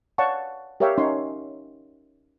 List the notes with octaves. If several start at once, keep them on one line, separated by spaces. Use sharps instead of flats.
C#5 D5 F5 F#5 A5 C#6
G4 A#4 C#5 E5 F5 G5
C#4 D#4 C#5 C6